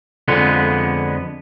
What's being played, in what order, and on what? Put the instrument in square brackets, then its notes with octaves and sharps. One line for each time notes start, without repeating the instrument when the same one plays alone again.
[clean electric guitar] F2 D3 G#3 B3